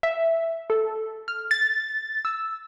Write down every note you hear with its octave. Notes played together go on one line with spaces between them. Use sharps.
E5
A4
F6
A6
E6